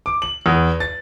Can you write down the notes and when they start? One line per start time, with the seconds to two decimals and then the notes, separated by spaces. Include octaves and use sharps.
0.06 D6
0.22 F#7
0.46 E2
0.80 A6